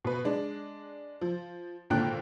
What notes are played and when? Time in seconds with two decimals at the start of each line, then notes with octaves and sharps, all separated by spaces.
0.05 B2 B4
0.24 G#3 D4
1.21 F3
1.90 G#1 A#2 D3 A4 G5 F#6